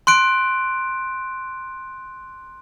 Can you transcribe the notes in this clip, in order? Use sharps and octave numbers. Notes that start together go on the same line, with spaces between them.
C6 F#6 D7